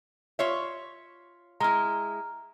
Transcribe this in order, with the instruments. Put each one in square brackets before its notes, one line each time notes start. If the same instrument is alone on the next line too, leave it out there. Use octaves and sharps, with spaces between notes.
[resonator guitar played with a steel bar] F4 C#5 E5
[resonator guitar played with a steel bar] G#3 E4 [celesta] A#5 F6